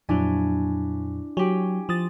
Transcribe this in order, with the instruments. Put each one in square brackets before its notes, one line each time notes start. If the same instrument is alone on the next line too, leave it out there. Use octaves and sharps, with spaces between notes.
[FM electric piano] F2 A#2 F#3 [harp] D4 E4 G#5
[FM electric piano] F#3 [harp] G4 G#5
[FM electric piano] F3 D#6 A6